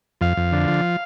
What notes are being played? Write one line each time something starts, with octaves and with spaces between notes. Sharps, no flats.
F2 F5
F2
D3
F3